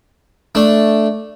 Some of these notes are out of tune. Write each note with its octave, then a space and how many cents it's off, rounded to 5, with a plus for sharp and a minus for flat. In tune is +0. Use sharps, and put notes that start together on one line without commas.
A3 +0 D4 +0